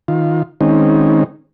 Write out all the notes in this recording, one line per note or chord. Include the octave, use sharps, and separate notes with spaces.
D#3 F4
D#3 G#3 C4 C#4 D#4